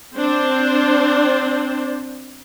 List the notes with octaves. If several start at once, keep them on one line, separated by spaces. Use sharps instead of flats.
C4 D4 C5